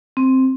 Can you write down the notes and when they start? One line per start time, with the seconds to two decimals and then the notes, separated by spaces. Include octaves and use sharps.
0.17 C4